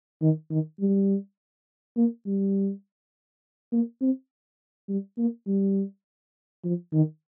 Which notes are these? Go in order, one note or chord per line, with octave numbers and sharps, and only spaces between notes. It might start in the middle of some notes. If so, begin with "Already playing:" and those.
D#3
D#3
G3
A#3
G3
A#3
C4
G3
A#3
G3
F3
D#3